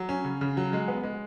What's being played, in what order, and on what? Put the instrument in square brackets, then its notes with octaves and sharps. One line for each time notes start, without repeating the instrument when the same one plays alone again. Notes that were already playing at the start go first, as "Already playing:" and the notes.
Already playing: [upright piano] F#3
C#4
C#3
C#3
F#3
G#3
B3
G#3